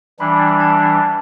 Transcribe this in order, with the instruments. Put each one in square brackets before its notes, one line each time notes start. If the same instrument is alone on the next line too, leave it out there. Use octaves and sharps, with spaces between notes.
[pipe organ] E3 G3 D4 [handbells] B5
[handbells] A5
B5
A5